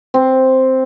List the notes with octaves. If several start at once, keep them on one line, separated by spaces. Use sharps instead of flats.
C4